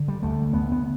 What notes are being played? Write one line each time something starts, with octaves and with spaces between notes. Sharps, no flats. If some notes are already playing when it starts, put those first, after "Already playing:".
Already playing: D3
G3
D2 A3
D2 B3
B3